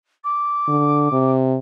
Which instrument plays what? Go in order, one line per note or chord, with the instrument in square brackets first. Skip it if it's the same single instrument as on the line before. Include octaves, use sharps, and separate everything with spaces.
[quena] D6
[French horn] D3
C3